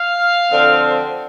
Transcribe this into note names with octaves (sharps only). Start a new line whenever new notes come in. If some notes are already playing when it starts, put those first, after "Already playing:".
Already playing: F5
D3 F3 C4